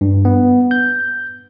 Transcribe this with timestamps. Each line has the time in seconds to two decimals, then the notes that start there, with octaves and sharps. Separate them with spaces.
0.01 G2
0.25 B3
0.71 G6